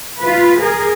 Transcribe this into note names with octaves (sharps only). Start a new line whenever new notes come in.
F4 B4
G#4 A#4